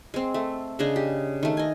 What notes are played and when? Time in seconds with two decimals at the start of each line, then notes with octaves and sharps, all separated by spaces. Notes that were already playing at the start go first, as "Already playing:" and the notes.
0.14 G#3 C4
0.34 A3
0.79 C#3 D4 G#4 D#5
0.96 G4
1.43 D#3 A3
1.57 D#5 G#5